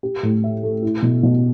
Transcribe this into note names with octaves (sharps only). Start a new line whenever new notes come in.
G4
A2
E5
A3
E4
B2
B2